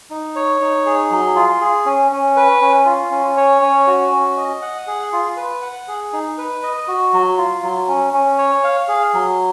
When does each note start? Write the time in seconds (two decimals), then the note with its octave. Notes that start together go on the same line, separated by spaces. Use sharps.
0.11 D#4
0.36 C#5
0.61 D#4
0.86 G#4
1.11 F#3
1.36 F4
1.61 G#4
1.86 C#4
2.12 C#4
2.36 B4
2.61 C#4
2.86 F4
3.11 C#4
3.37 C#5
3.62 C#4
3.87 F#4
4.12 C#4
4.37 D#5
4.62 F#5
4.87 G#4
5.13 F4
5.37 B4
5.62 F#5
5.88 G#4
6.13 D#4
6.38 B4
6.63 D#5
6.88 F#4
7.13 F#3
7.38 F4
7.63 F#3
7.88 C#4
8.13 C#4
8.38 C#5
8.64 F5
8.88 G#4
9.14 F#3